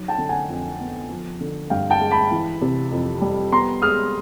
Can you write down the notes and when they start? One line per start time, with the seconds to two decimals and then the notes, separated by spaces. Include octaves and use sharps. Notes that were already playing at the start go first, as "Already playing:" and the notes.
Already playing: F#3 D#4
0.08 G5 A5
0.18 D3
0.29 F#5 G#5
0.49 F2
0.80 B3
1.10 F3
1.41 D3
1.70 G2 F5 G5
1.90 G5 A5
2.01 G#3
2.11 A5 B5
2.31 E3
2.62 C3
2.91 F2
3.21 G3
3.52 B3 A#5 C6
3.82 G#3 D#6 F6